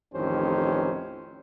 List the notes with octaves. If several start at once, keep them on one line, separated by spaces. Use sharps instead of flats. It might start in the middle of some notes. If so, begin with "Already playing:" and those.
A1 F2 D#3 C#4 G4 C5